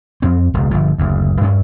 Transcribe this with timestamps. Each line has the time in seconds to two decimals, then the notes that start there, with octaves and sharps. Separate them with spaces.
0.22 F2 C4
0.54 E1 C#2
0.71 G1 F3
0.98 F#1 D2
1.41 G2 C#4